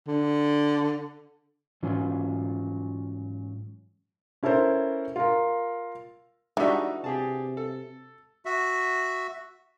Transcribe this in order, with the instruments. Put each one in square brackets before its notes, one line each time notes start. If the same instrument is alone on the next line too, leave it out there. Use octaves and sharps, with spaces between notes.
[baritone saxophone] D3
[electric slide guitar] G#2 E3 F#3 C#4 F4
[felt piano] C#4 E4 A4 A#4 C5
F4 A#4
[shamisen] E3 [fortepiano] G3 D#4 E5 [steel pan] G#3 D4 F#4
[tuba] C3 [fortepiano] G4 G#4 A5
[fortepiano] A4
[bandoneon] F#4 E5